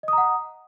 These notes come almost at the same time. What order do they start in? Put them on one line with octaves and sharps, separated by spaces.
D#5 D#6 A#5 F#5